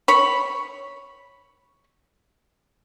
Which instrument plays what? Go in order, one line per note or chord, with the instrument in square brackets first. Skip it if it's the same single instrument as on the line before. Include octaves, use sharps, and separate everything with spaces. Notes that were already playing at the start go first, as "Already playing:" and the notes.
[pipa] C#5 B5